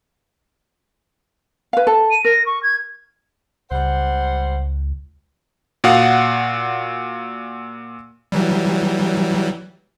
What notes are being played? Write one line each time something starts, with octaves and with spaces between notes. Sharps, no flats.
B4 F5
A4
D#7
A#4 A#6
C#6
G#6
C#2 G3 C5 F#5
A#2 F#4 F5 F#5 D#6
E3 F#3 G3